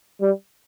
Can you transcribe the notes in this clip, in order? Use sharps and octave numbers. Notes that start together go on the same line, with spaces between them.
G3